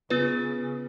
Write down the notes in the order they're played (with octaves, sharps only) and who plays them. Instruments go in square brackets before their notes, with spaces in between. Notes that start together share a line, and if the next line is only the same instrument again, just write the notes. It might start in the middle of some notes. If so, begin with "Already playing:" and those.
[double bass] C#3 [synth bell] B3 F4 B4